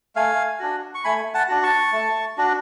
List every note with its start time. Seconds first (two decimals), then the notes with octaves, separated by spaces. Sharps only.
0.16 A3 F5 G#5
0.60 D4 F#4
0.95 C#6
1.04 A3 G#5 B5
1.34 F#5 A5
1.49 D4 F#4
1.63 A5 C#6
1.93 A3
2.38 D4 F#4